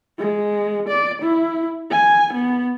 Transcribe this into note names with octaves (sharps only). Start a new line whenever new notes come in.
G#3
D5
E4
G#5
B3